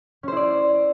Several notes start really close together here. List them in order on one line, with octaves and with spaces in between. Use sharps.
C#4 C5 E4 D5